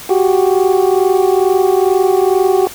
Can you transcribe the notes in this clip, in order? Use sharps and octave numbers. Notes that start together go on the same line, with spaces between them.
F#4 G4